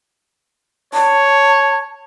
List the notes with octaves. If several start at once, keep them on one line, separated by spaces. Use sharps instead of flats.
C#5 A5